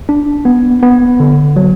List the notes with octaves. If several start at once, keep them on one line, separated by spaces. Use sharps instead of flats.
D4
B3
B3
D3
F#3